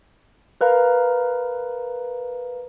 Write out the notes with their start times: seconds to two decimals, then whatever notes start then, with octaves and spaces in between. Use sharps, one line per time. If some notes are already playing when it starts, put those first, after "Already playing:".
0.61 A#4 B4 F5 A#5